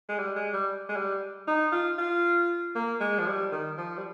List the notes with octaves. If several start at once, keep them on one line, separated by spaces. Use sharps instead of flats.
G#3
G3
G#3
G3
G#3
G3
D#4
F4
F4
A#3
G#3
F3
G3
D#3
F3
G3